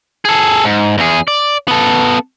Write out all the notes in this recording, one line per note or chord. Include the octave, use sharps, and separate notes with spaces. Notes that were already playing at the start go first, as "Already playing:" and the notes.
G#4 A4
G#2
E2 G#4
D5
B3 A4